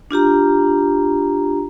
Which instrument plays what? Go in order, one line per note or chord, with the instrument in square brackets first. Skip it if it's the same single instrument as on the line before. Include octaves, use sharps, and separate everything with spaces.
[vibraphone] D4 F4 G4 A#5